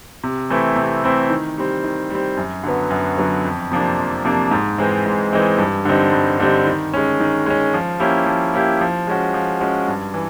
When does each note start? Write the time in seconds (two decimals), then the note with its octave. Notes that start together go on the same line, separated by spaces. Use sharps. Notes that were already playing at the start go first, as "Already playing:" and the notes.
0.24 C3
0.50 E3 A3 C4 E4
0.76 C3
1.03 E3 A3 C4 E4
1.30 D#3
1.58 G3 C4
1.84 D#3
2.10 G3 C4
2.37 F#2
2.64 D3 F#3 B3
2.90 F#2
3.18 D3 F#3 B3
3.45 F2
3.71 C3 F3 A#3 D4
3.99 F2
4.25 C3 F3 A#3 D4
4.51 G#2
4.78 E3 G#3 C4 D#4
5.06 G#2
5.33 E3 G#3 C4 D#4
5.58 G2
5.85 D3 G3 C4 D#4
6.13 G2
6.40 D3 G3 C4 D#4
6.66 D#3
6.93 G#3 C#4
7.20 D#3
7.46 G#3 C#4
7.74 F3
8.00 A#3 C#4 E4 G4
8.26 F3
8.53 A#3 C#4 E4 G4
8.81 F3
9.07 G#3 C#4 F#4
9.34 F3
9.60 G#3 C#4 F#4
9.88 G2
10.14 E3